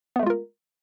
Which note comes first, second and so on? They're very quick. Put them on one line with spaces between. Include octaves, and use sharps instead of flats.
B3 A3 G#3 F4 A#4